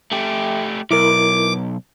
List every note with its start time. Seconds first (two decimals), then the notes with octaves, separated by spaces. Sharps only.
0.12 A3 G4
0.91 B1 E4 A#4 D6